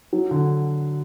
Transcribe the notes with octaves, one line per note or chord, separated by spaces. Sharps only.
F#3
D3